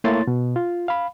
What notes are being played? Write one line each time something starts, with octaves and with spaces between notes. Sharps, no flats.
A3 A#3 E4 C#5 C6 A6
B2
F4
F5 B5